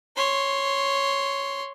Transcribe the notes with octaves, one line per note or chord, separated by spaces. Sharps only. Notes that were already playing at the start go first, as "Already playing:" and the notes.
C#5 C6